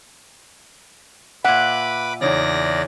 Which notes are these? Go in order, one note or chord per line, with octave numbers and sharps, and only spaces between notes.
A#2 B4 E5 F#5 B5 D6
E2 C#3 D#4 D5 A#6